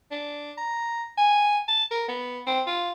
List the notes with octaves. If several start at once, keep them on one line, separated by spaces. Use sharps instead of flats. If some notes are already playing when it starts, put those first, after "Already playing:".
D4
A#5
G#5
A5
A#4
B3
C4
F4